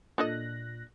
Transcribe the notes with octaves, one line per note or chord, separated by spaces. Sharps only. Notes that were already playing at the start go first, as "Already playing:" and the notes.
A#2 D4 A4 D#5 F#6 A#6